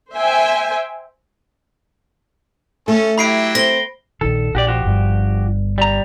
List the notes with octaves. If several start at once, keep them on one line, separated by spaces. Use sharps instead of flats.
C5 E5 G5 G#5
A3 C#4 A4
F#3 E4 G4 B5 C7 D7
C4 A#6 G7
A#1 D#3 A4
A#1 F#4 G4 D5
F3 F#4 G4
G1 G2
G3 A#5